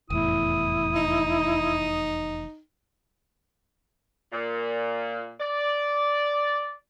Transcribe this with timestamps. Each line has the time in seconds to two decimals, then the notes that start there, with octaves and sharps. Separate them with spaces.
0.10 F1 E2 A2 E4 D#6
0.96 D#4
4.32 A#2
5.40 D5